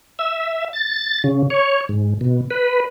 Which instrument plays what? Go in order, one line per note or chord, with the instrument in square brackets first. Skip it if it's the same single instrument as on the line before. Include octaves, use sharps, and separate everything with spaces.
[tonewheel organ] E5
A6
C#3
C#5
G#2
B2
B4